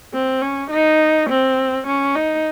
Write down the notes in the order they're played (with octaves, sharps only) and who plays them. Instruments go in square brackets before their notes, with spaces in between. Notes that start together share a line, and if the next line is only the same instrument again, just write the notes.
[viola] C4
C#4
D#4
C4
C#4
D#4